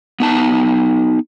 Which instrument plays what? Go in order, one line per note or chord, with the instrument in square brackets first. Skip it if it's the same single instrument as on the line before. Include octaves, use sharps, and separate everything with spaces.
[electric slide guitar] B3 D#4 A5